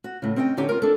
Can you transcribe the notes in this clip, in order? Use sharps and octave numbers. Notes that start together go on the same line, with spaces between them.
F#4
A2 C#3
C4 C#4 D#5 F5 G5
D3 B3 C#4 D#4 G4
F4 A#4
D4 A4